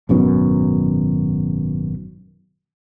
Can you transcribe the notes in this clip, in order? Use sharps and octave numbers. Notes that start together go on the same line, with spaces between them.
G#1 F#2 B2 D#3